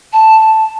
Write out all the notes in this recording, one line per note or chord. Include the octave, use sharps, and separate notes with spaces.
A5